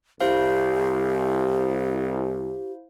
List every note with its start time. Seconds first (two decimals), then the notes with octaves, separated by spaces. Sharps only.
0.20 C2 E4 G4 C5 F5